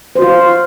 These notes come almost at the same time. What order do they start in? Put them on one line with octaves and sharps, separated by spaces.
C5 F#4 F4